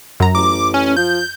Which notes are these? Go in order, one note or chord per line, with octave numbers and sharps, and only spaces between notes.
F#2 A#5
A1 D6
C#4
F3 G6